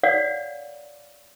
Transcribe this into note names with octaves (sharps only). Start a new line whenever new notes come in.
C#5 D5 F5 F#5